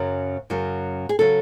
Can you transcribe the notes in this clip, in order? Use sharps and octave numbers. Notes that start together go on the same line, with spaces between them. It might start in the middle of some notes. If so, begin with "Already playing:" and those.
Already playing: F#2 C#3 F#3
F#2 C#3 F#3
G#4
C#3 F#3 A4